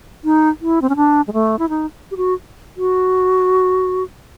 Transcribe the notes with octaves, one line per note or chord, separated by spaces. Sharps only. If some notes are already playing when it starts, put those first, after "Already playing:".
D#4
E4
C4
C#4
D4
G#3
A3
E4
D#4
G4
F#4
F#4